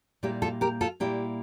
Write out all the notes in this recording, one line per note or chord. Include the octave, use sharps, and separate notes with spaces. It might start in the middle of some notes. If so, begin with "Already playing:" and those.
A#2 G3 A#3 E4 G4
F4 A4
G4 A#4
F4 A4
A#2 G3 A#3 E4 G4